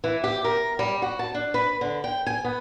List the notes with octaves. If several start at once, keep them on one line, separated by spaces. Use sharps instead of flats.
E3
G4
A#4
G3
F#4
A5
D4
B4
D3
G5
G#5
B3